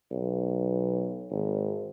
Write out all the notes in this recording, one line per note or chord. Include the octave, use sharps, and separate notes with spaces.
B1
G#1